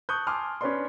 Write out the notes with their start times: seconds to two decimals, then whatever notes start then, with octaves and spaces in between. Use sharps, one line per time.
0.09 A5 C#6 D#6 F#6 G6
0.27 G#5 A5 C6 D6 D#6 F6
0.61 C#4 D4 B4 C#5 D5 C6